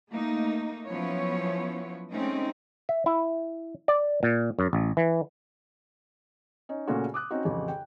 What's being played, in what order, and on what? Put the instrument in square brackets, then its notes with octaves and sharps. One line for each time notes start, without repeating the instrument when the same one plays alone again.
[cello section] A3 A#3 D#4
F3 F#3 B3 C#4 E4 C#5
G#3 A3 C4 C#4 D#4
[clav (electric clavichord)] E5
E4
D5
A#2
F#2
A1
E3
[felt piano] C#4 D#4
A#2 C#3 A3 C#4 F#4
D6 D#6 F#6
C4 C#4 D#4 F#4
A1 F2 C#3
G5